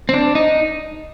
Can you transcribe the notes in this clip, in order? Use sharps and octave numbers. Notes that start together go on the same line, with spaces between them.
C4
D4
D#4